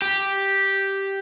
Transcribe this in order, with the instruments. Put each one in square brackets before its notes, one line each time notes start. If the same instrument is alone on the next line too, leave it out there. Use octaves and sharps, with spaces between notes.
[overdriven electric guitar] G4